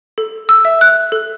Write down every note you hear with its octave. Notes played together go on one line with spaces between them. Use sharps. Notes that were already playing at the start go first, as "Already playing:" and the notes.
A4
E6
E5
F#6
A4